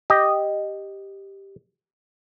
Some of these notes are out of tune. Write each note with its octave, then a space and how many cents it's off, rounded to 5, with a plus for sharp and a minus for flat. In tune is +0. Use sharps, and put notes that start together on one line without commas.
G4 +0 D#5 -5